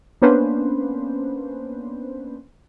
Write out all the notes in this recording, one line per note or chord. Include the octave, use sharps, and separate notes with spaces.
A#3 B3 C#4 D4 B4 C5